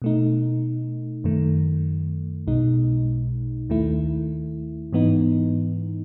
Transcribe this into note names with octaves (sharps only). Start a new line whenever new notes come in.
B2 A3 D#4
F#2 D#3 A3
B1 B2 G#3 D#4
D#2 D#3 A3 E4
G#2 E3 B3 D#4